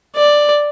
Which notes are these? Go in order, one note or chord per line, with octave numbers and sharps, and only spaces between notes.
D5